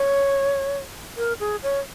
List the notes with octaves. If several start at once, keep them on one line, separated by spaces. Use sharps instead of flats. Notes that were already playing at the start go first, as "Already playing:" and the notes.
Already playing: C#5
A#4
G#4
C#5